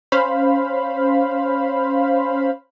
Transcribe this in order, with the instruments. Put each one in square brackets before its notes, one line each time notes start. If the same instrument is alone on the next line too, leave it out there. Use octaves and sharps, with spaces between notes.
[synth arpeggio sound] C#4 C5 F5 B5